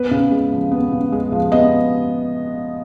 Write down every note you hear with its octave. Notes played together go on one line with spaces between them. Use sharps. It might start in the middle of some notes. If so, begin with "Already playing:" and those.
Already playing: B3 B4
C#3
G#3
F3
B3
C#3
G#3
F3
B3 D#5